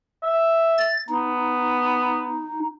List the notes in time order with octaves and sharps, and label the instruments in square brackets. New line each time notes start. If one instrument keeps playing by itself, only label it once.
[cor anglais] E5
[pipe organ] A6
[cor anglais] B3 [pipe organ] D#4